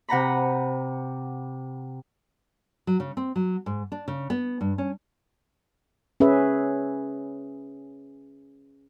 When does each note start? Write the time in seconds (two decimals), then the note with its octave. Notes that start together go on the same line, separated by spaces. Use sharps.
0.09 C3 F#5 A#5 B5
2.87 F#3
3.00 C#3
3.17 C4
3.36 F#3
3.66 G#2
3.92 D4
4.08 C#3
4.30 B3
4.61 G2
4.78 C#4
6.20 C#4 G#4 B4 E5